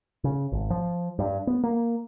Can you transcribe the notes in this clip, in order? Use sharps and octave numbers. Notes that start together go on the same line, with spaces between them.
C#3
G#1
F3
G2
B3
A#3